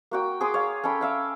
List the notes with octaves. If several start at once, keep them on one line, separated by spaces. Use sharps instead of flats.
A#3 F#4 G5
G#4 C6 D6 D#6
C#5 F5
C#4 A4 G5 B5
E5 F5 G5